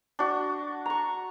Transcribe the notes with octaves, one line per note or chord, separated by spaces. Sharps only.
D4 F#4
A#5 C#6